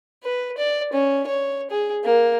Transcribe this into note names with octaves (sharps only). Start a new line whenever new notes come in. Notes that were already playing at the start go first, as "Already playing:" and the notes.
B4
D5
C#4
C#5
G#4
A#3